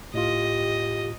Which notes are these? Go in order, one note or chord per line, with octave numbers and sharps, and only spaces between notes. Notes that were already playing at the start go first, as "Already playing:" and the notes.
A2 F4 G4 D#5